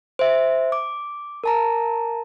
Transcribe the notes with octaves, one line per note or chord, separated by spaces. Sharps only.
C5 E5
D6
A#4 A5 A#5